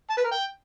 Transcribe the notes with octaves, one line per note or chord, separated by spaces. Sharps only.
A5
B4
A#4
G5